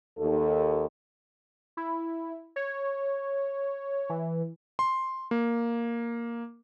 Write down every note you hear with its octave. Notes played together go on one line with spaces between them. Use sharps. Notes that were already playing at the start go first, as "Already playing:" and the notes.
D#2 A4
E4
C#5
E3
C6
A#3